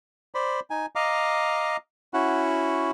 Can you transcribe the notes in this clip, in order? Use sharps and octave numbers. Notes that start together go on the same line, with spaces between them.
C5 D5 B5
D#4 G#5
D#5 F5 A#5 D6
C#4 E4 F#4 F#5